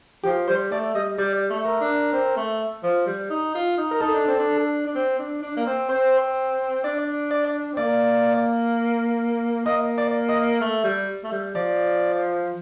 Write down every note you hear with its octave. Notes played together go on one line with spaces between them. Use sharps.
F3 G4
G3 C5
A3 D5
G3 D#5
G3 D5
A3
A#4
D4
C4
A3
F3
G3
D#4
F4
D#4
A#4
D#4 A4
D4
C4
D4
D4
C4
D4
D4
A#3
C4
C4 C5
D4 D5
D5
C4
A#3 D5
A#3 D#5
D5
D#5
A3
G3
A3
G3
F3 D5